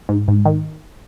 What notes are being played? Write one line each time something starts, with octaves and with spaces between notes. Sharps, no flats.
G#2
G#2
D#3